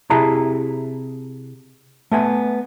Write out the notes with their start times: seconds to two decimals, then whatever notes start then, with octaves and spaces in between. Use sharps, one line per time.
0.10 C3 E4 G#4 A5 A#5
2.11 A3 B3 G#5